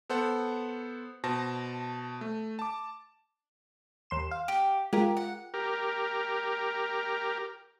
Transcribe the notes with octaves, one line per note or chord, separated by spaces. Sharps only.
B3 A4 C5 F#5
B2 C5 A5 A#6
A3
A5 D6
D#2 C6 E7
F5
G4
G#3 F4 G4 A#4
F#5
G4 A#4